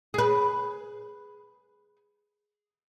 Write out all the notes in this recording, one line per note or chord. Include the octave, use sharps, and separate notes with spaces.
G#4 B4